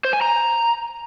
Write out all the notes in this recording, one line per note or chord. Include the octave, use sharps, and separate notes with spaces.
C5
G#5
A#5